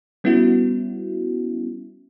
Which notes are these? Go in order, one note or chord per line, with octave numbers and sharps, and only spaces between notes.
G3 B3 C#4 E4 F#4